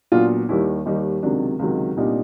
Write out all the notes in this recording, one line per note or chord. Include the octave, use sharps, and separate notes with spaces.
A#2 F#3 B3 D4 F4
D#2 D#3 G3 E4
D#2 D#3 G3 D#4
C#2 C3 D#3 F#3 D4
C#2 C3 D#3 F#3
C2 A#2 G3 B3 D4 D#4